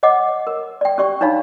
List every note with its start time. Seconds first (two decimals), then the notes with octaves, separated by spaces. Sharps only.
0.03 C#5 D#5 F#5 D6
0.47 A#4
0.81 D5 G5
0.98 C#4 G4 D5 C#6
1.21 D4 D#4 C#5 F5 B5